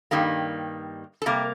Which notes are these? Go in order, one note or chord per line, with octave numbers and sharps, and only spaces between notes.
G2 D#3 G3 A#3
A4
C3 G3 A#3 A#4